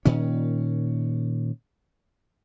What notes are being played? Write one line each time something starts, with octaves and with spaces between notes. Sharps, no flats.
A#2 D#3 C#4